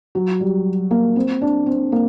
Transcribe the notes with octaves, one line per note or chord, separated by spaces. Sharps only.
F#3
G3
A#3
C4
D4
C4
A#3